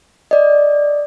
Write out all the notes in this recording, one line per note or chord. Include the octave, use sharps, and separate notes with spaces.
D5 D#5